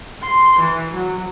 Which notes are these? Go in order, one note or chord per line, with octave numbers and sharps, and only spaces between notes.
C6
E3
F#3